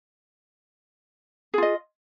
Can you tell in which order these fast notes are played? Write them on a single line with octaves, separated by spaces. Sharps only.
G#4 F4 D#5